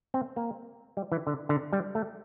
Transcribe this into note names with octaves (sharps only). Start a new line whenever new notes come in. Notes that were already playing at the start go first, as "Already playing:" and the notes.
C4
A#3
G3
E3
D3
D3
G3
A3